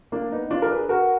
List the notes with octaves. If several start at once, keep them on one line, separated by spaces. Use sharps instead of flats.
A#3 D4
B3 D#4
D4 F4
A#4
G#4 B4
F#4 A#4